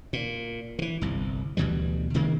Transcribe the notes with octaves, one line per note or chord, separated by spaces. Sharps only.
A#2
D3 E3
G1 C2
D2 B2 E3 G3
C3 D#3 G#3 A#3